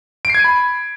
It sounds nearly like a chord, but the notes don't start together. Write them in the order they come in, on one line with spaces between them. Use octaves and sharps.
D7 C7 G#6 D#7 B5